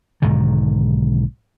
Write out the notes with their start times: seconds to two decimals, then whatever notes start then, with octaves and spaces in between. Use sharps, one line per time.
0.22 B1 G#2 D3 D#3